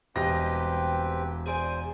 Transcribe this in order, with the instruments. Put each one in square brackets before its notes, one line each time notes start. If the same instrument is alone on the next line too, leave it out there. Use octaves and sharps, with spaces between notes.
[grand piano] E1 A#6 [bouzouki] G3 D#5 [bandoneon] C4 G4 B4
[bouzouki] G#4 D5 G#5 [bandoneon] C5